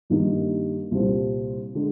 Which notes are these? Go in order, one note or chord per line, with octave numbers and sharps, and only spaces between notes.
G2 D#3 G3 A#3 D#4
C2 A#2 G3 C4 F4
D3 G#3 D4